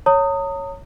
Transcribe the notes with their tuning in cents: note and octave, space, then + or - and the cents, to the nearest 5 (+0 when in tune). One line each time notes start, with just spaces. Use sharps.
C#5 +0 A#5 -40 D#6 +0